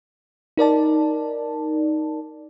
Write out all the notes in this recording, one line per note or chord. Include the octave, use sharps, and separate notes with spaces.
D#4 A#4 D5 A5